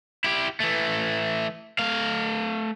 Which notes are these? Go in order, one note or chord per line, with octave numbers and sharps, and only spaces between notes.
E4 G4
E3 A3
A3 F5